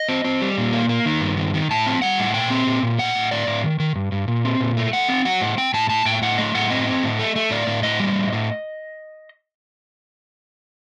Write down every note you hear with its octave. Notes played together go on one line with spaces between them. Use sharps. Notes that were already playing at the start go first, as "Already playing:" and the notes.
Already playing: D#5
C4
C4
G3
A#2
A#3
A#3
D#3
G2
D#3
D#3
A2 A5
C4
G3 F#5
A2
A#2 G5
C4
A#2
A#2
A2 F#5
A2
A2 D5
A2
D#3
D#3
G2
G2
A#2
C4
A#2
A3
A3 F#5
C4
F#3 F#5
A2
C4 G5
A2 A5
A2 A5
A2 G5
A2 F#5
A3 D#5
A2 F#5
C4 D#5
C4
A2
A3
A3
A2 D5
A2
A2 D#5
G3
A2
A2